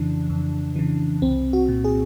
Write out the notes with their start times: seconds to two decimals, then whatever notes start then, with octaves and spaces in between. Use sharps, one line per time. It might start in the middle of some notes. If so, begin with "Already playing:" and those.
Already playing: F2 C#3 E3 D4
0.29 F2
0.76 C#3 E3
1.22 C2 C4
1.53 F#4
1.69 A#2
1.84 G#4